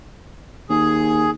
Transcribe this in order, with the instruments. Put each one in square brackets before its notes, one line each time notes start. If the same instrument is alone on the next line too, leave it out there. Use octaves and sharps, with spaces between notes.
[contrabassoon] D#2 [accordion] G#4